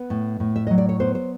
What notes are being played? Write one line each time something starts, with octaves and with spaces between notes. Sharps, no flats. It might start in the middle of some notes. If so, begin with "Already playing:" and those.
Already playing: B3 B4
A2
A2
E5
F#3 D#5
D5
C#5
B3 C5
C5